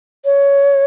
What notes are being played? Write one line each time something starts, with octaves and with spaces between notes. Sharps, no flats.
C#5